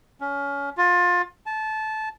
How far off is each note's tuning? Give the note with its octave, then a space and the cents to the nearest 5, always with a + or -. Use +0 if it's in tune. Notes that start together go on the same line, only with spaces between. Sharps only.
C#4 +25
F4 +25
A5 -20